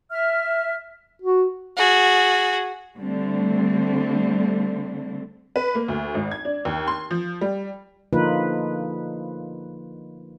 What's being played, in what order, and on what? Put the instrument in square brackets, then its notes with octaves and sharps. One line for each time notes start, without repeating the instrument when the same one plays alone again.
[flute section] E5 F6
[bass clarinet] F#4
[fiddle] F#4 G#4
[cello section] D3 G3 A3 C4
[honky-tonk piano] B4
A#3
D2
G#1
G#6
D4
D#2
C6
F3
G3
[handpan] D3 F3 A#3 D#4 F4 B4